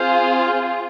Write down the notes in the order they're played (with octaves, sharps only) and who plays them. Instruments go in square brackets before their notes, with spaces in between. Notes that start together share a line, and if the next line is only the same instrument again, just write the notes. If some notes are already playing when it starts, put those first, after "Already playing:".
Already playing: [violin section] C4 F4 G#4 [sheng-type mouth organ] C5 F5